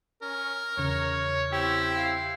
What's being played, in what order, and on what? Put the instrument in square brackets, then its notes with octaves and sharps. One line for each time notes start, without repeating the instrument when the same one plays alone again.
[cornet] C#4 [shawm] A#4
[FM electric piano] E2 C#3 [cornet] C#5
[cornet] C4 [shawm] E4 [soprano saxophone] G4
[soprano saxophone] F5